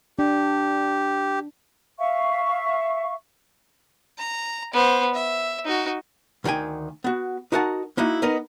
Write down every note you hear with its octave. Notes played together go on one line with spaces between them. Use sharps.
D4 G4
E5 F5 C#6
A#5
B3 C5
E5
D#4 F#4
D2 D#3 F#4 G5 G#5
B3 F#4
D#4 E4 F#4 A#4 F#5 A5
A#3 D#4 E4 F#4
B3 D#4 A#4 D#5